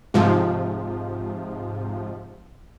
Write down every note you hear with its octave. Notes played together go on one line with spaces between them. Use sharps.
G#2 C3 F3